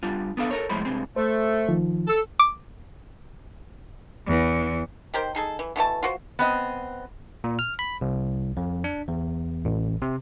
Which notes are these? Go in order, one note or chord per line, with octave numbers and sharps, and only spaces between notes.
G3 D4 F4
B3 D4 A4 F5
A4 A#4 C#5
C2 F2 A2 G#3 C5 B5
G2 C3 G#3 C4
A3 C5
D#3 F3
A4
D6
E2
D#3 G4 A#4 C5
D#4 G#4 A4
E3
B2 E3 A3 A5
F4 F#4 C5
B3 C4 D#5
A#2
F6
B5
C2
F2
D4
E2
A1
C3